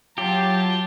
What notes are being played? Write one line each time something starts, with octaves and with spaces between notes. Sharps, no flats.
F#3 F4 G4 A5